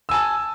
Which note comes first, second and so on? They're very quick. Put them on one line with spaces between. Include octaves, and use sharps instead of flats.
E6 G#5 A5